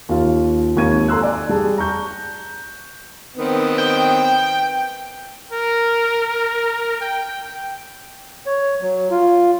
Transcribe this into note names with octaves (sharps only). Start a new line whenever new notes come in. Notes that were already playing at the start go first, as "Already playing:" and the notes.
D#2 F4
G#1 D#2 C#6 G#6 D#7
A4 A#5 C6 E6 F#6
D5 G#5
G3 G#4 A5
A#5 C#6 G6
D#3 B3 C4
G5
A#4
G5
C#5
F#3
F4